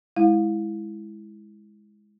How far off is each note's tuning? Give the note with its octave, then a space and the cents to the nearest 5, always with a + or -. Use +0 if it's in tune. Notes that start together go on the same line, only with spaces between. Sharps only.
G#3 +0 E4 +0 F5 +30